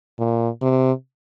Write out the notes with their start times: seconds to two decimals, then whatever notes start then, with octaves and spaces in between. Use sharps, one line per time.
0.19 A#2
0.62 C3